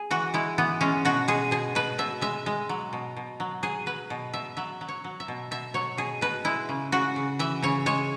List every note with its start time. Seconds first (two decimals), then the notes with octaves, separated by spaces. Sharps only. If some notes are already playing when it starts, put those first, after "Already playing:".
Already playing: G#4
0.11 E3 F#4
0.34 G#3 E4
0.58 E3 B3
0.81 G#3 C#4
1.05 B2 F#4
1.28 G#3 G#4
1.51 B2 G#4
1.75 B2 B4
1.98 B2 E5
2.21 G#3 E5
2.46 G#3
2.69 F#3
2.93 B2
3.17 B2
3.40 F#3
3.63 F#3 G#4
3.86 F#3 B4
4.10 B2
4.33 B2 E5
4.57 F#3 E5
4.81 F#3
4.88 C#5
5.04 F#3
5.20 E5
5.28 B2
5.51 B2 E5
5.74 F#3 C#5
5.97 B2 G#4
6.21 B2 B4
6.45 G#3 E4
6.69 C#3
6.92 C#3 F#4
7.16 C#3
7.39 E3 E5
7.63 C#3 C#5
7.86 G#3 C#5